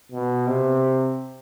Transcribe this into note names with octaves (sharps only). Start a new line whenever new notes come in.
B2
C3